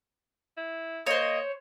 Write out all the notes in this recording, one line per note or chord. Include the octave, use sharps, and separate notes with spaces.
E4
A#3 C5 C#5 D#5